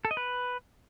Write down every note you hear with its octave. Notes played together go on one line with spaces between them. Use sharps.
A4
D#5
B4